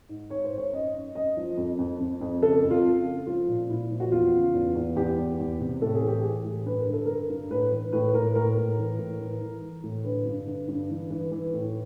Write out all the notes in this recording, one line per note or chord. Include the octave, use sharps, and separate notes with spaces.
G#2
G#2 C#5
C5
G#2
C#5
F#2 D#5
F#2
F#2 D#5
F3
F2
F2
F2
F2
C#3 A4
F2
F4
F2
C#3
F3 F4
A#2
A#2 E4
F3
F#4
E2 F4
C#3
E2
E2
E2 G4
E2
E2
C3
A2 A4
G#4
E3
G4
E3 G#4
A2
G2 B4
A#4
D3
A4
G2 A#4
G2
A2 B4
E3
A2 B4
A2 A#4
A2 A#4
A2
E3
A2
E3
E3
E3
A2
D3 B4
G2
D3
G2
E3
E3
E3
A2